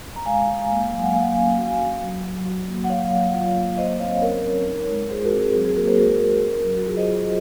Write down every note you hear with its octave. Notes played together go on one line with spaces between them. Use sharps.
A#5
G#3 F5 G#5
G#3
A#3
F#3
F#5
A#3 F5 G#5
C#4
F#4
F#4
F#3
F#3
F#4
A#3
F#5
F#3 C#5 F5
F#3
F4
A#3
F#3 C5 D#5
C4 C#5 F5
C#4 A#4 C#5
C#4
D#4
G#3
F4 G#4 C5
F#4 A#4
C4
G#4
F#3
G#4
A#3 F#4 A#4
G#4 C5
G#3 F#4 A#4
F#4
C#4
F#3
F#4
F4 G#4
C5 D#5
F4